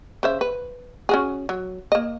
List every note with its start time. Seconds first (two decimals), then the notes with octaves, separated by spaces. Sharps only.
0.23 C#3 C5 E5
0.41 B4
1.09 C#4 F#4 G#4
1.49 F#3
1.92 A#3 D#5